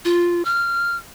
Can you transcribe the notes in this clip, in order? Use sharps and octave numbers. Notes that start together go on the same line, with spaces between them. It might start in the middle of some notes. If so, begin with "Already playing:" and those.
F4
F6